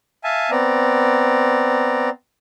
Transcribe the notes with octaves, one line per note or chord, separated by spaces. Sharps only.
E5 F5 G#5 A5
B3 C4 D5 A#5